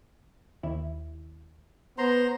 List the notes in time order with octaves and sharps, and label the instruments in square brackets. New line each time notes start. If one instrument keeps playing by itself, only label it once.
[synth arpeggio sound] D#2 E4
[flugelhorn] B3 [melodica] C5 A#5 C6